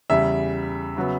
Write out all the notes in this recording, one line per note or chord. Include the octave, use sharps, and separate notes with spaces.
E2 C#3 G3 E5
C#3 F#3 B3